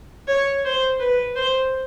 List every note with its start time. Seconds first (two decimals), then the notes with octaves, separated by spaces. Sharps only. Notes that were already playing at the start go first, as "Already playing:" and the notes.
0.28 C#5
0.64 C5
0.99 B4
1.36 C5